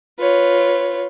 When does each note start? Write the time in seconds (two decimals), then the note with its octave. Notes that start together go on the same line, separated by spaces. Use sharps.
0.19 F4 B4 C#5